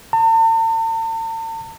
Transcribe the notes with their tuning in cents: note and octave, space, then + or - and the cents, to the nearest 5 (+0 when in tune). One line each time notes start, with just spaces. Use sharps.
A5 +45